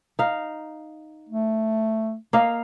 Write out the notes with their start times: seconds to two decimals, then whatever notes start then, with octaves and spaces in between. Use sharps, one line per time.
0.19 D#4 F5
1.29 A3
2.33 A#3 D#5 F5